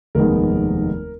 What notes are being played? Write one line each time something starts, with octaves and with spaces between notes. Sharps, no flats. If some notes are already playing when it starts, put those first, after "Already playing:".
F1 D#2 D#3 G#3 B3 A#4